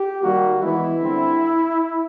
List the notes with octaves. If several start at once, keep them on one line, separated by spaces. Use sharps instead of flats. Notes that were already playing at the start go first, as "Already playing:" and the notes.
Already playing: G4
D#3 G3 A#3 F#4
E3 G#3 B3 E4
D3 G3 C4